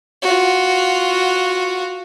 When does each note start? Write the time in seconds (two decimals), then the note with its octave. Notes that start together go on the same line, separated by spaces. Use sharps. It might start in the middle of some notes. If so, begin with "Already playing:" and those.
0.23 F4 F#4